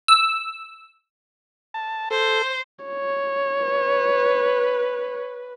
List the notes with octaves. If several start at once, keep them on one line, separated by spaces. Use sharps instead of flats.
E6
A5
A4 C5
C#5
B4